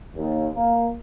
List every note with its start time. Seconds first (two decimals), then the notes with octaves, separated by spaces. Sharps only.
0.15 D#2
0.55 A#3